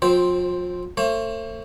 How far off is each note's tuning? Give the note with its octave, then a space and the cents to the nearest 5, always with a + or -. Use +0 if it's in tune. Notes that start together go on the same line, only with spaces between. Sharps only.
F3 +35 C4 +0 C5 +5
A3 +35 C5 +35